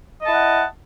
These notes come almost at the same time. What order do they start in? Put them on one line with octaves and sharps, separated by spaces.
D#5 A5 E4 F#5